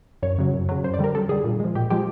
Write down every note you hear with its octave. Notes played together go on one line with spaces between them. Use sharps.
F#2 C#5
C#3 F#3
F#2
C#3 F#3
F#2 C5
D5
D3 G3 A#4
F#2 A4
D3 G3 G#4
A#2
F3 G#3
A#2 G4
F3 G#3 G4